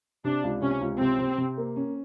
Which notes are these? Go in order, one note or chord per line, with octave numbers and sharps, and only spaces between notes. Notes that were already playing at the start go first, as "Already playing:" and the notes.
C3 D4
C#2
C3 C#4
C#2
C3 C4
C3
C3
A#3
C#4